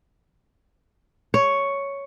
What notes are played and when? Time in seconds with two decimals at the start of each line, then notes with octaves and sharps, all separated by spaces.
1.34 C#5